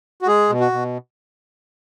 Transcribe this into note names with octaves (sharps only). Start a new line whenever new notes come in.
F#4
G#3 G#4
B2
F#4
B2